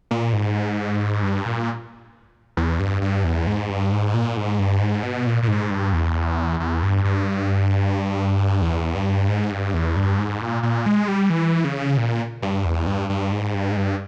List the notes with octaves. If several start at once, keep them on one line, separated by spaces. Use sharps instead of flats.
A#2
G#2
G2
A#2
E2
G2
G2
E2
G#2
G2
G#2
A#2
G#2
G2
G#2
B2
A#2
A#2
G#2
G2
E2
E2
G2
G2
E2
G2
G#2
G2
E2
G2
G#2
A#2
A#2
G#3
G3
E3
C#3
A#2
G2
E2
G2
G2
G#2
G2
G#2
G2